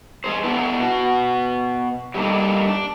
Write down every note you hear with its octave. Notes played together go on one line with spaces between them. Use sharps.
E2 G#3 G#4 C5
A3 B3 D4 E4 B4
B2 F#4
F#3 G3 A3 A#3 D4 D#4
D4